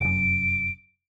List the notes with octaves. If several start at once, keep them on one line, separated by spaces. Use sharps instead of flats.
F1 F#2 D7